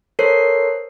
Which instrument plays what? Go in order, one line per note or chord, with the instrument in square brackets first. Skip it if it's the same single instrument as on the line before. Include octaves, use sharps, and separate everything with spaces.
[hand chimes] A4 A#4 C5 C#5 C7